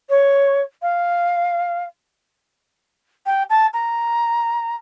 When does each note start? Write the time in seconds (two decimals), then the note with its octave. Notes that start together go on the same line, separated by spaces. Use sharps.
0.10 C#5
0.82 F5
3.26 G5
3.50 A5
3.74 A#5